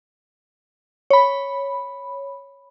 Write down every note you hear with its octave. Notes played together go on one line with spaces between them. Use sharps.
C#5 B5